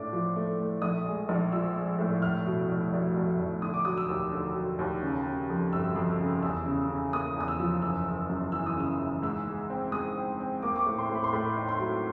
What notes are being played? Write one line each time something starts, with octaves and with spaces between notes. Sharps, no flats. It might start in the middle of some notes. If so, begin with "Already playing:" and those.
Already playing: A2 A3 D4 D6
F3
A3
A3
A#1 D#6
G#3
A#1
F3 E6
G#3
A2
F1 F6
B2
F1
F1
F1
F1
D3 D#6
D6
F#3 D#6
E6
D#2
D3
F#3
D#2
C#3
C#3
F2
G1 E6
F2
C#3
E2 E6
C#3
C#3
A#3 D#6
E2 D#6
E6
F3
F#1 E6
F#1
F#2
E3 E6
D#6
C#3 E6
E3
G#2 E6
G#3
C4
G#3 D#6
C4
C4
A#3 D6
D6
C#6
A2
C6
A2
B5
C6
A2 B5
D#4
C6
F#3